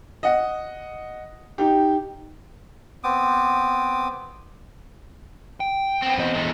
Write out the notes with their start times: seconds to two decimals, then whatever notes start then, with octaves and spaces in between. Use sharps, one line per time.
0.23 D#5 F#5
1.58 D#4 G4
3.04 B3 C4 D6 D#6
5.60 G5
6.02 B3 C4
6.18 E2 D#5
6.35 A2 G#3 A3